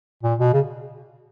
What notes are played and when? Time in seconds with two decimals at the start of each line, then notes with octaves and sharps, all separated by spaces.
0.23 A#2
0.39 B2
0.54 C#3